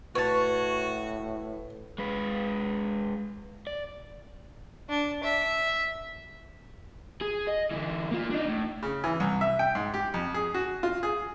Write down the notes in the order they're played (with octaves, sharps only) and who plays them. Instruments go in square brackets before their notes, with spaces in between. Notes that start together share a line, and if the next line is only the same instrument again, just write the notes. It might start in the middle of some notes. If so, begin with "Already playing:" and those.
[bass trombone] A2 [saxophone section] F#4 [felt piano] B4 [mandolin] C#5 A5
[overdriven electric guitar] G#3 B4
D5
[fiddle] D4
E5
[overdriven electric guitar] G#4
D#5
D3 E3
A#3 F4
D4 D#4
A2
[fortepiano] C#3
E3
C2
E5
G5
G#2
G4
F2
G#4
F#4
F4
G#4